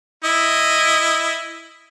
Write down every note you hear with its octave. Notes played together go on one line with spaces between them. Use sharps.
E4 D#5